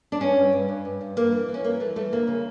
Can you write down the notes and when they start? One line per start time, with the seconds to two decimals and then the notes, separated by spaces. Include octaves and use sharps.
0.12 D4
0.21 G2 C#4
0.37 G2
0.53 G2
0.69 G2
0.85 G2
1.01 G2
1.16 G2 A#3
1.32 E3
1.48 E3
1.54 C#4
1.64 E3 A#3
1.80 E3 A3
1.96 E3 A3
2.12 D2 A#3
2.27 C#3